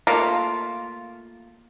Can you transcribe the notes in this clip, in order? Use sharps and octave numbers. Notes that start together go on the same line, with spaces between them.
A3 A#3 F4